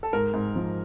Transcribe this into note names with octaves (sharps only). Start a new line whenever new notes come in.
A4
G#2 A#4
G#2
F3